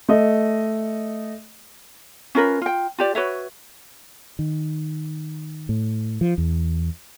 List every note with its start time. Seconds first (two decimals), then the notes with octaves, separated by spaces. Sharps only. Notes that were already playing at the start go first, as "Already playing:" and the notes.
0.09 A3 D#5
2.35 C#4 F4 A#4 B4
2.62 F4 G5
2.98 F4 G4 D5
3.15 F#4 B4 C#5 E5
4.39 D#3
5.69 A2
6.21 F3
6.38 E2